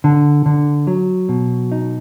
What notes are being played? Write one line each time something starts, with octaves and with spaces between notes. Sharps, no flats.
D3
D3
F#3
B2
D#4